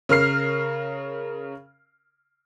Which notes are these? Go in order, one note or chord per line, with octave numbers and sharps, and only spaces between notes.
C#3 A#4 F6 C7